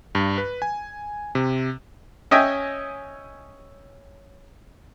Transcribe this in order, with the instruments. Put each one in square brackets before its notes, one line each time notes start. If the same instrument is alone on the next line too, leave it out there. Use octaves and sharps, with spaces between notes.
[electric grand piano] G2
B4
G#5
C3
[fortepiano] C#4 D#5 E5 G5 G#5